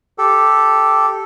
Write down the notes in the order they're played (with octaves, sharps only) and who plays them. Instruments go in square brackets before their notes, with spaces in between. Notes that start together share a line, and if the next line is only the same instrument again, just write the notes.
[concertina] G4 A4